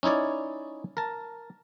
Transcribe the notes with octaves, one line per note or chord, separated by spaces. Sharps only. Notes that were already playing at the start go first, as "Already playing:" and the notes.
C#4 D#4 E4 C#5 D5
A#4 A5